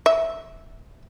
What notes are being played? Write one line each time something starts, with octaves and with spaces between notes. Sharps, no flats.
E5